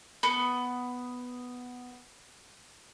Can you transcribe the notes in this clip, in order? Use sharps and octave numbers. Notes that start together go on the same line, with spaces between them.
B3 B5 C#7